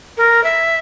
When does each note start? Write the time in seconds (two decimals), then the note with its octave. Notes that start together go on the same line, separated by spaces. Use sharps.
0.17 A#4
0.44 E5